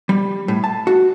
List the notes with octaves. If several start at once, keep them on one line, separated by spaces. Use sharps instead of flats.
G3
A2
A5
F#4